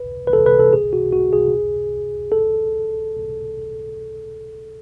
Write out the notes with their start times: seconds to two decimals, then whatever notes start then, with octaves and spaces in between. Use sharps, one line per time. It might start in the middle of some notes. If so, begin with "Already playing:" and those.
Already playing: B4
0.27 B4
0.33 A4
0.46 B4
0.59 A4
0.73 G#4
0.93 F#4
1.13 F#4
1.33 G#4
2.32 A4